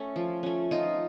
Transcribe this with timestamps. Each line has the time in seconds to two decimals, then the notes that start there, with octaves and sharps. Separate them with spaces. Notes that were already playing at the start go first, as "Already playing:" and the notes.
Already playing: A3 C#4
0.16 F3
0.43 A3 C#4
0.71 F3 D#4 F4